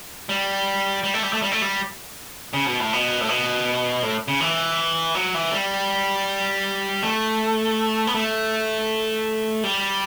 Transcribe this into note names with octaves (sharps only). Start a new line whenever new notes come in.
G3
G3
A3
G3
A3
G3
A3
G3
C#3
B2
A2
B2
A2
B2
A2
C#3
E3
F#3
E3
G3
A3
B3
A3
G3